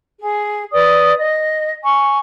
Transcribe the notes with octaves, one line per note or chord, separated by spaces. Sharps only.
G#4
B4 D5 D#6
D#5
G#5 C#6